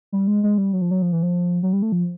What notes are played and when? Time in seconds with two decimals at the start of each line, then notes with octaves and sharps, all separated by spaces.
0.12 G3
0.27 G#3
0.43 G#3
0.58 G3
0.73 F#3
0.82 F3
0.91 F#3
1.02 F3
1.12 E3
1.23 F3
1.63 F#3
1.73 G3
1.82 A3
1.92 F3